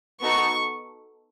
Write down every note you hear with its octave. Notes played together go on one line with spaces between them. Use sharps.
B3 D#4 F#4 A4 C#6